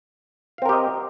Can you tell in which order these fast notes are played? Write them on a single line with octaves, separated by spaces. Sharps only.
F5 C4 A#4 G4 D#5